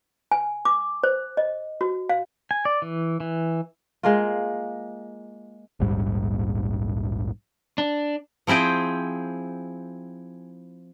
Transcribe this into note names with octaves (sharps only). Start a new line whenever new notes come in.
G#5
D6
C5
D#5
F#4
F5
G#5
D5
E3
E3
G#3 A#3 F4
A#1 D#2 G#2 G3
D4
F3 C4 E4 G#4 G5